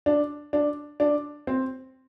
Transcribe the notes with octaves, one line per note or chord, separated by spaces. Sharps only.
D4
D4
D4
C4